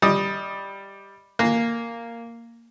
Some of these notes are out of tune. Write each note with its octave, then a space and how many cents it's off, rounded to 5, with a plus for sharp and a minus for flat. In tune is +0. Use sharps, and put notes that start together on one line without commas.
G3 +0 D#5 +20 D#6 +0
A#3 -5 G#5 +0